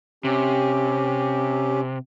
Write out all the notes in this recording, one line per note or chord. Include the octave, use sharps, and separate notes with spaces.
C3 C#4 G4